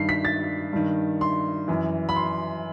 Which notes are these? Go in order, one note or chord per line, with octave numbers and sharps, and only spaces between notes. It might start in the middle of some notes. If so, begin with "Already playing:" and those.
Already playing: G2 D#3 C7
B6
A6
G2 D#3
C6
F#2 E3
B5
C6